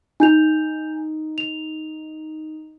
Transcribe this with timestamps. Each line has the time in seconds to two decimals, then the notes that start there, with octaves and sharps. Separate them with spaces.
0.20 D#4 G#5 G6 F7
1.38 F7